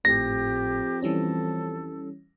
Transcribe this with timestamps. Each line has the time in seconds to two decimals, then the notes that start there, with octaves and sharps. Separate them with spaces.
0.05 G#1 F2 A2 G4 A#6
1.02 E3 G3 C#4 A4